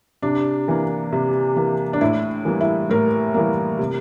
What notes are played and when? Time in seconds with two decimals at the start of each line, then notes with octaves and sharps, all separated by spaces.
0.22 C3 D4
0.68 E3 A#3
1.13 C3
1.56 E3 A#3
1.93 D4
2.01 A2 E4
2.45 E3 G3 A#3
2.61 E4
2.90 A2 A#4
3.34 E3 G3 A#3
3.79 C3